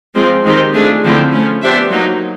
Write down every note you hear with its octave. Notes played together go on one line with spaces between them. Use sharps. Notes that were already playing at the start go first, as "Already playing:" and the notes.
F3 G#3 C4
D#3 G#3 C4 D#4 G4
A3 D4 F4 G#4
D3 F3 A3 C4 E4
F3 A3 C#4
B3 D4 G4 C5 E5
F#3 A#3 D#4